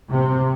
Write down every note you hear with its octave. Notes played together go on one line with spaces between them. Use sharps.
C3